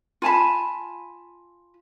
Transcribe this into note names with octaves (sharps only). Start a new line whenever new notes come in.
F4 G#5 A5 B5